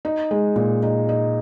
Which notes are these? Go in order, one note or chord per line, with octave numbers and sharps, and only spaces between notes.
D#4
G#3
A#2
D#4
D#4